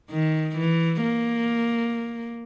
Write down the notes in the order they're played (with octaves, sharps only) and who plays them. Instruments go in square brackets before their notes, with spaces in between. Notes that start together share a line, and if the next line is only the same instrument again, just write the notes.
[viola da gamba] D#3
E3
A#3